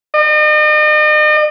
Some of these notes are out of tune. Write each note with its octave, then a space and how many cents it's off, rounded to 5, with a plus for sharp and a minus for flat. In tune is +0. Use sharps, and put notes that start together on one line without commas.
D#5 -40